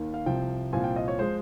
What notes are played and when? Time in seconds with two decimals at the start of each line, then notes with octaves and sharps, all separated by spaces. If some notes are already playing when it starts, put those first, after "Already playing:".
Already playing: D#2 D#3 A#3
0.14 F5
0.26 C2 C3 F3 G5
0.73 C2 A#2 F3 C4 G#5
0.84 G5
0.96 D#5
1.08 C#5
1.19 F3 G#3 C5